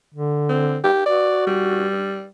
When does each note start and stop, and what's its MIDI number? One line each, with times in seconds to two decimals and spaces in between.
0.14 0.81 50
0.49 0.78 60
0.84 1.02 67
1.06 1.89 66
1.06 1.43 74
1.47 2.27 55